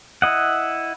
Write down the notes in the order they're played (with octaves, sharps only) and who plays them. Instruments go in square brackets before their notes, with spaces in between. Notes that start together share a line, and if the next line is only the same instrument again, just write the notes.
[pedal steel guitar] E4 D#5 F#5